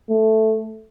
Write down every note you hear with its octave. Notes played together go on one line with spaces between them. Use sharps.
A3